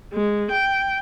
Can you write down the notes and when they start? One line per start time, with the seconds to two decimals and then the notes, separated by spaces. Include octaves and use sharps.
0.13 G#3
0.51 G5